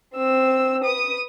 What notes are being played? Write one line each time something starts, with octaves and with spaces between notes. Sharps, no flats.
C4 E6
B4 D#6